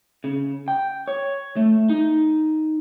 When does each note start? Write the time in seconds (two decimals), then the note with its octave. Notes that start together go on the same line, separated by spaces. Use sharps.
0.24 C#3
0.68 G5
1.08 C#5
1.56 A3
1.90 D#4